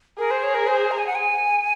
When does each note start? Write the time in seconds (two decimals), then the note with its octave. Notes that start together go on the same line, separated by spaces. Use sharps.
0.18 G#4 A#4
0.31 C5
0.43 C#5
0.55 A#4
0.67 C5
0.91 A#5
0.99 G#5
1.07 F#5
1.15 G#5